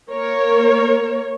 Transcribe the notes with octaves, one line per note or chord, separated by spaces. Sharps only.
A#3 A#4 C#5